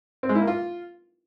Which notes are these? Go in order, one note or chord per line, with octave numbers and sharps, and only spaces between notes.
C4
G#3
E4
A#3
F4